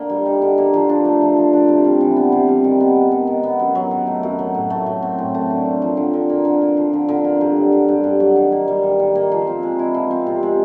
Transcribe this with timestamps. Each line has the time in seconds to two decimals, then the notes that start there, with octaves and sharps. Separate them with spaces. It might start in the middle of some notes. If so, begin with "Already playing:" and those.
Already playing: D3 A#3
0.10 G3
0.26 D#4
0.42 D3
0.58 A#3
0.74 F3
0.89 D4
1.05 A3
1.21 F3
1.37 F3
1.53 D4
1.69 C3
1.85 G3
2.01 E3
2.16 B3
2.32 C3
2.48 G3
2.64 D#3
2.80 B3
2.96 G#3
3.12 D#3
3.27 D#3
3.43 B3
3.60 F#2
3.75 F#3
3.91 D#3
4.07 A3
4.23 F#2
4.39 F#3
4.55 A2
4.70 A3
4.86 F#3
5.03 C4
5.18 A2
5.35 A3
5.50 D3
5.66 A#3
5.82 F3
5.97 D3
6.14 D3
6.30 A#3
6.45 D3
6.61 A#3
6.77 F3
6.93 D3
7.09 D3
7.24 A#3
7.41 G2
7.57 F#3
7.72 D3
7.89 G2
8.04 G2
8.20 F#3
8.36 D#3
8.52 A#3
8.68 G3
8.83 D#3
9.00 D#3
9.15 A#3
9.32 F3
9.47 C4
9.63 G#3
9.79 E4
9.94 F3
10.11 C4
10.27 C3
10.43 G#3